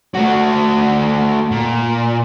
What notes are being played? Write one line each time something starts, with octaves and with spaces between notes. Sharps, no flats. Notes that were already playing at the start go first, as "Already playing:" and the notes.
A3 F#4
A#2